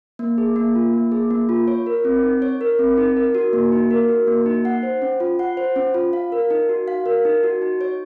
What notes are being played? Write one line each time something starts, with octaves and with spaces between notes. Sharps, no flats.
A#3
G#4
A#3
F4
A#3
G#4
A#3
F4
C#5
A#4
C4
D#4
C#5
A#4
C4
D#4
A#4
F#4
A#3
D#4
A#4
F#4
A#3
D#4
F#5
C5
C#4
F4
F#5
C5
C#4
F4
F5
A#4
D#4
F#4
F5
A#4
D#4
F#4
D#4
C#5